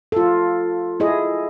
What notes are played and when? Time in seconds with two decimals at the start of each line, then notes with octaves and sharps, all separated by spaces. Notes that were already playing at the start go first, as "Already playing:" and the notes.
0.12 F4 A4
1.00 E4 G#4 D#5